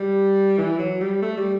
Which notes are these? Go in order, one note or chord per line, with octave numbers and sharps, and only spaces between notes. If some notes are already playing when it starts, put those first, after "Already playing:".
Already playing: G3
E3
F#3
G3
A3
G3